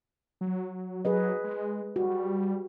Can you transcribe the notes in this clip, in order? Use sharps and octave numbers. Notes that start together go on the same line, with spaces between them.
F#3
F#3 G#4 B4 D#5
G#3
G3 F#4